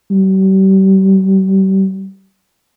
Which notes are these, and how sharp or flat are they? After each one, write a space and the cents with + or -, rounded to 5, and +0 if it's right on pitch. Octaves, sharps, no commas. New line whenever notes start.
G3 -35